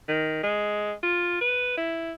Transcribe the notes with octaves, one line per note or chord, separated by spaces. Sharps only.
D#3
G#3
F4
B4
E4